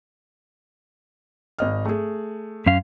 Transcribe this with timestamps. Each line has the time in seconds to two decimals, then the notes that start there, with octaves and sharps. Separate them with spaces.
1.59 G#1 D#5 F6
1.86 A3 G#4
2.66 F#2 C#4 F5